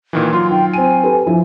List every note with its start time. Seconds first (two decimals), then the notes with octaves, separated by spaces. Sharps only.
0.13 A#2 D#3 E3
0.33 F#3 F4 C6
0.50 D#3 G5
0.73 C4 G#5 D#7
1.03 G4 A4 B4
1.26 F3 E4